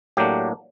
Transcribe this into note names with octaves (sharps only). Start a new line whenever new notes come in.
A2 F#3 A#3 D4 G4